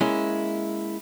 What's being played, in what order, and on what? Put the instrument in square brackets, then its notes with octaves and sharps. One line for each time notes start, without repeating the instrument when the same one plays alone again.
[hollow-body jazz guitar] G#3 A#3 C#4 E4